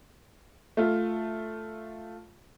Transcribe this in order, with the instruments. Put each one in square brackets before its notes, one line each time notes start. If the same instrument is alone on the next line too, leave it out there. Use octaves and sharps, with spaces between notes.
[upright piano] A3 F4